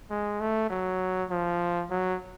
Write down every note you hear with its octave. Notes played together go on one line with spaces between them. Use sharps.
G#3
A3
F#3
F3
F#3